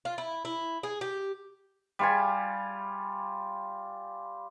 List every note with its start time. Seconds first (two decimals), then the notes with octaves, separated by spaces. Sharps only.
0.05 F4
0.18 E4
0.45 E4
0.83 G#4
1.01 G4
1.99 G3 F4 G#5